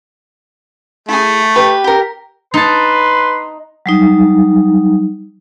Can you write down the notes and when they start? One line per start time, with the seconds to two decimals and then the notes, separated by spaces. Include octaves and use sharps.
1.09 A3 E4 G#4
1.56 G4 B4 G5
1.84 G4 A#4
2.54 D#4 B4 A5 C6
3.86 F#3 G3 D#4